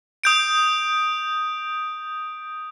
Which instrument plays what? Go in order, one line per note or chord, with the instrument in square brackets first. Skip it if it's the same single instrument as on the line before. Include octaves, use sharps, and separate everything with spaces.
[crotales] D#6 G6 D7